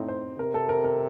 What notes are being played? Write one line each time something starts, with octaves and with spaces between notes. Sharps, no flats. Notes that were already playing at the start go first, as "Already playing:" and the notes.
Already playing: A2 C4 D#4
C5
C3 A#4
A4
A#4
A#4